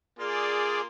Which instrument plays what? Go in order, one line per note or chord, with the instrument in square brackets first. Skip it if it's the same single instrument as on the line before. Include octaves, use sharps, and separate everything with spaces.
[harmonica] A#3 F4 [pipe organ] G#4 D5